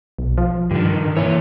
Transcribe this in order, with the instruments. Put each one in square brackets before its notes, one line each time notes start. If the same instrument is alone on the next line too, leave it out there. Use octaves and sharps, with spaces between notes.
[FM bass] B1
F3
[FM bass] G2 [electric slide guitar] D3 D#3
[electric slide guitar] A#2 C#5 [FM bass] E3